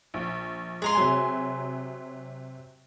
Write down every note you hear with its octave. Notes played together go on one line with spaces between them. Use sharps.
A#1
G#3 G#4 A#5 C6
C3 F#3 G#5